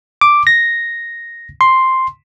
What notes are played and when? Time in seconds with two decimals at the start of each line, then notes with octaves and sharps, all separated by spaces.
0.21 D6
0.47 A#6
1.61 C6